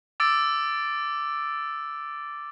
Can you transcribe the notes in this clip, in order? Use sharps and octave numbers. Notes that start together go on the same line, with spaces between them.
D6 E6 A6 D7